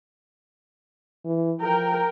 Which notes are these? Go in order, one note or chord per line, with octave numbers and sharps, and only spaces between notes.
E3
F3 A#4 G5